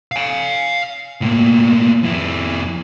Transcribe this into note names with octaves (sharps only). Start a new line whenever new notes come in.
F5 G#5
A2 A#3
F2 E4